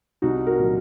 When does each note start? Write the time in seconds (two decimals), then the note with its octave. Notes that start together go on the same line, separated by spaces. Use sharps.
0.22 C2 D#4 F#4
0.47 F#4 A#4
0.59 A#2 F#3